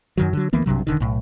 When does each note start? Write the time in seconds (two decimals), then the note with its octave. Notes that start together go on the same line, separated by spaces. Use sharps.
0.17 F#2 D#3 F#3
0.33 D3 F#3
0.53 D2 E3 A#3 B3
0.66 B1 G2 C3 F#3
0.87 E1 D3 D#3
1.00 B1 A2